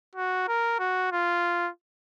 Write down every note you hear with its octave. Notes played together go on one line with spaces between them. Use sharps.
F#4
A#4
F#4
F4